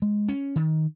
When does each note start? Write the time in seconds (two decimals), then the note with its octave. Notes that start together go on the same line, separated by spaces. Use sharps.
0.02 G#3
0.28 C#4
0.56 D#3